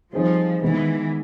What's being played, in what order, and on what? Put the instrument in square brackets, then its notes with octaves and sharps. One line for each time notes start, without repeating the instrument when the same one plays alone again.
[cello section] F3 [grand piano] G3 C4 D#4 G#4 C5
[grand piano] D#3 G#3 B3 [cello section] E3